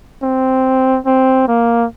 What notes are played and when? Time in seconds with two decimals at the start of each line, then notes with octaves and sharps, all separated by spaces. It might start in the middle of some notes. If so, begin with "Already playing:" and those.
0.23 C4
1.06 C4
1.48 A#3